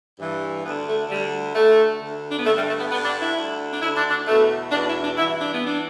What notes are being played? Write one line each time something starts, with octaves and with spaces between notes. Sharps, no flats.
G2 E3
D2 D3 B3
A3
D2 D3 G3
D2 D3 A3
D2 D3
D4
B3
G2 D3 A3
G3
A3
B3
G2 D3 B3
D4
E4
D2 D3
D4
D2 D3 E4
D4
D4
E2 B2 A3
E2 B2 D4
E4
D4
G2 E3 E4
D4
B3
E3 D4